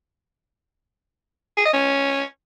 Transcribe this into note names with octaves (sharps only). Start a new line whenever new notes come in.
G#4
D#5
C#4